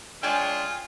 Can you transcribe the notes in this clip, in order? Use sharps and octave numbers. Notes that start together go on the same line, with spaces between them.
G#3 D4 F4 C#5 G5 G#5